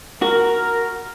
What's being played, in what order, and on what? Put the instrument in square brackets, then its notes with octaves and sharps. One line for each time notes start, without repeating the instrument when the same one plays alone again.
[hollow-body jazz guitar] F#4 [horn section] A#4